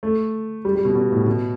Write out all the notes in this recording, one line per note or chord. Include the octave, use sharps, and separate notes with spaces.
A3
G3
G3
B2
B2
A2
B2